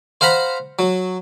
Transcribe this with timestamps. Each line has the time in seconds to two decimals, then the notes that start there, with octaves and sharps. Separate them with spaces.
0.21 C5 F5 F#5 A#5 B5
0.79 F#3